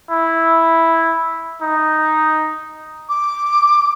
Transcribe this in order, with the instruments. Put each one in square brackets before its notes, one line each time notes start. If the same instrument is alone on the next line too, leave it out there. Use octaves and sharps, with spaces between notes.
[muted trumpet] E4
D#4
[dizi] D6